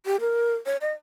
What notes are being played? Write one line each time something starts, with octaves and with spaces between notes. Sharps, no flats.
G4
A#4
C#5
D#5